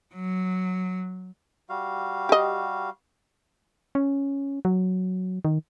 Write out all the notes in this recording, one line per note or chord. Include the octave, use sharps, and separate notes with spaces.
F#3
G3 F#4 F5
G4 D#5
C#4
F#3
D#3